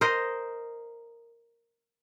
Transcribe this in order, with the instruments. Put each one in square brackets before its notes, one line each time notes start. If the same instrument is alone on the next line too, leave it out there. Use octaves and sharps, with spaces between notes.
[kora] A#4 C5 D#5